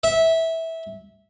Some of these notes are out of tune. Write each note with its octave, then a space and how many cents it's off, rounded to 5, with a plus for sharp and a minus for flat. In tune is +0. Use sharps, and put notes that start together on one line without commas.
E5 -15